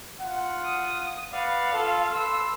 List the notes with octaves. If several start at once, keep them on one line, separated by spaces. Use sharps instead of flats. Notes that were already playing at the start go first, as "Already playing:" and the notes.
F4 F#5
D#6
B4 D5 F5 F#5
F4 A4
A4 B4 C6 E6